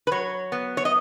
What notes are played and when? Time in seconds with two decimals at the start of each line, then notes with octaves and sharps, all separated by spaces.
0.07 B4
0.12 F#3 C#5
0.52 B3
0.77 C#5
0.85 D#5